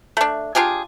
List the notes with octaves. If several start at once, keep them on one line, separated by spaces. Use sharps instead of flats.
A3 D4
D4 F4 G4 G#4